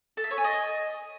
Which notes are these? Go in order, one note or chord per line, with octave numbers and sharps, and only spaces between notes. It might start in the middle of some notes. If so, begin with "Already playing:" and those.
A4
E5
C#5
G#5
D#5